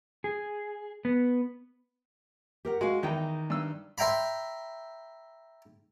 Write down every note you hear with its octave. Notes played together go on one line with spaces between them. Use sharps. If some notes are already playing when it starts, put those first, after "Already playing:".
G#4
B3
G4 A#4 F#5
G#3 F#4 F5
E2 D#3 D#4 G5
G2 E6
C5 E5 G5 A#5 B5